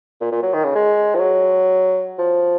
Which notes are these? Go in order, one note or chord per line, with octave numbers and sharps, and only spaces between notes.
A#2
A#2
F#3
D#3
C#3
G#3
F3
F#3
F3